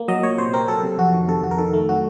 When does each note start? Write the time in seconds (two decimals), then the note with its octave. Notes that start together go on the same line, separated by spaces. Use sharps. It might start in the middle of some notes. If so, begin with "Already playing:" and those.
Already playing: A#3
0.08 F#3 D#5
0.23 A#2 C#5
0.38 C3 C5
0.53 C4 A#4
0.68 F#3 A4
0.83 C3
0.98 F2 F#4
1.13 D#3
1.28 C3 A4
1.43 F2 F#4
1.51 A#4
1.58 D#3 A4
1.74 A3
1.89 F#3 F#4